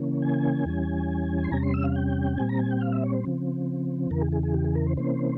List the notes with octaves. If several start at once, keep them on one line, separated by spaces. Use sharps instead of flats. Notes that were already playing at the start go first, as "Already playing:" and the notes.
Already playing: C#3 E3 A#3 C#4
G#5
E2 E3 G3 C#4
C6
E2 C3 G3 C#4 A#5
C6
E6
F5
G5
A#2 G3 C4 G#5
A#5
G#5
G5
F5
E5
C#5
C5
C#3 F3 C4
E2 C#3 E3 A#4
G#4
G#4
G#4
G4
G#4
A#4
C5
C3 E3 A#3 C#4 C5